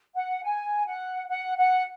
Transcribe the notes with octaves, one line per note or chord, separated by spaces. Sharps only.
F#5
G#5
F#5
F#5
F#5